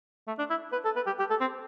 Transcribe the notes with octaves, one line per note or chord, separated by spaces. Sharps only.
A3
D4
E4
B4
A4
B4
G4
G4
A4
C4